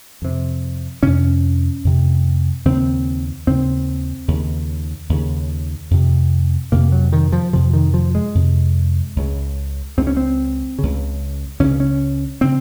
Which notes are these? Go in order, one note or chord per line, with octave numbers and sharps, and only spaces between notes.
F2 C3
F2 C3 C#4
F2 C3
D#2 C#3 C4
D#2 C#3 C4
D#2 C#3
D#2 C#3
F2 C3
F2 C3 A#3
F#3
D#3
F3
F2 C3 F3
D#3
F3
G#3
F2 C3
C#2 C#3
C#2 C#3 C4
C#4
C4
C#2 C#3
C#2 C#3 C#4
C#4
C#3 C4